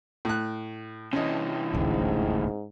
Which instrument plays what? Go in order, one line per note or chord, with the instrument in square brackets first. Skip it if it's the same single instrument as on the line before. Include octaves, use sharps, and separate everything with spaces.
[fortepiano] A2 F#6
[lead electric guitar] C3 E3 [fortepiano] C#4 D#5
[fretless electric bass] D#1 A1 D2 [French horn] G#2